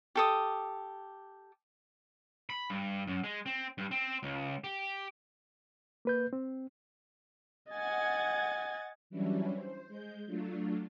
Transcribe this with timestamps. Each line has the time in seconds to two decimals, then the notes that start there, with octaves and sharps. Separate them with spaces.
0.15 G4 A4 D#6
2.50 B5
2.70 G2
3.07 F#2
3.24 G#3
3.46 C4
3.78 G2
3.91 C4
4.23 C#2
4.64 G4
6.05 A#3 B4 G6
6.33 C4
7.73 D#5 F#5 G#5 G#6 A6
9.10 E3 F#3 G3 C#4 D4 E4
9.56 C5
9.88 G#3 G6
10.26 F#3 A3 D4 F4